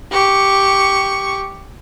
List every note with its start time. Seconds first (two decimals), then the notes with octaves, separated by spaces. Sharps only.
0.12 G4 C#6